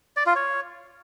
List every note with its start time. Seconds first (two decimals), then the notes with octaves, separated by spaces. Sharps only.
0.17 D5
0.26 F4
0.36 C#5